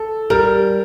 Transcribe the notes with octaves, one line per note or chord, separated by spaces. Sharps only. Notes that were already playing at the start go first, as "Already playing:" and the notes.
Already playing: A4
G3 A#4